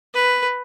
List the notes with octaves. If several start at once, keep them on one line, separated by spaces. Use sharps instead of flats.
B4